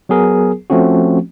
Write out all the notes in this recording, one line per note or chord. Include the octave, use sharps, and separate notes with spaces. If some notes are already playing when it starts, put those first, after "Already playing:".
F#3 B3 G#4 A#4
F3 A3 C4 C#4 F#4